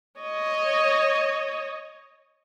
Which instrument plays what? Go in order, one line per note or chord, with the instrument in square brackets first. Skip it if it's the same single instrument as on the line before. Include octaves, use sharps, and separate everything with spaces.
[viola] C#5 D#5